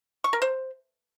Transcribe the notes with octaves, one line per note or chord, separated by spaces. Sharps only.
C#6
A#4
C5